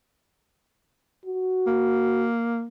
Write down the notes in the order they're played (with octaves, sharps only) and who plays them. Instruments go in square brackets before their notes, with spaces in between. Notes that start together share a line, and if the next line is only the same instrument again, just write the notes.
[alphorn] F#4
[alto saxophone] A#3